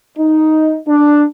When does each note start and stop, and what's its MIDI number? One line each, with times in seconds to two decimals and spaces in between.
0.17 0.77 63
0.87 1.23 62